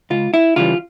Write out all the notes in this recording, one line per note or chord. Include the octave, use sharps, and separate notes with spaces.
C#2 F4
E4
C#3 E3 G3 F4